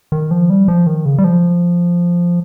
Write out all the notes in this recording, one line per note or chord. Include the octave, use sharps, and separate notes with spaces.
D#3
F3
G3
F3
D#3
C#3
G3
F3